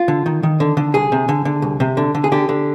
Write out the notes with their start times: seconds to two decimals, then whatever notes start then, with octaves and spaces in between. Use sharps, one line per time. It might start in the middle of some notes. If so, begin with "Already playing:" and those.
Already playing: F4
0.08 D3
0.26 D#3
0.43 D#3
0.60 D3
0.77 D3
0.94 C2 G#4
1.12 C3
1.29 D3
1.45 D3
1.62 C2
1.80 C3
1.97 D3
2.15 D3
2.24 G#4
2.32 D3 G4
2.49 D3